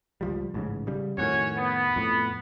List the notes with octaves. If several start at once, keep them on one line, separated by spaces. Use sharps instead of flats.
C#2 F3 G3
A1 G#2 C#3
C#3 G3
F2 A2 D#3 C#4 F#4 C#5
B3
F2 A2